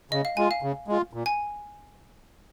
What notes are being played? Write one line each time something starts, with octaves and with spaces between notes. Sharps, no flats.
C#3 D#5
F5
G#3 F4 G#5
F5
C#3
G#3 F4
A#2
G#5